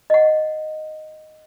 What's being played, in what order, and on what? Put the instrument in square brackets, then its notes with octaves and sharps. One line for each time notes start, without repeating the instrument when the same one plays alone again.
[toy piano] D#5 F#5